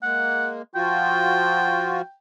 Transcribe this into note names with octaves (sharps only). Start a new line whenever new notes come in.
G#3 A#3 F#5
F3 F4 F#4 G5